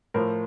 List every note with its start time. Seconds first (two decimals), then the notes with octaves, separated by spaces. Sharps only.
0.14 A2 F3 A#4 C5